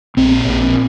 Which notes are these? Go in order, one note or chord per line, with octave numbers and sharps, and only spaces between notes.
A#1 A#2 C4
A#1 A#2